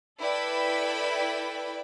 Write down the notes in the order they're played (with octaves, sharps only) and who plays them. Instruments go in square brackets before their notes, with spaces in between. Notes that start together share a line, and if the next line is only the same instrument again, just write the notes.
[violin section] E4 A4 B4 D5 G5 B5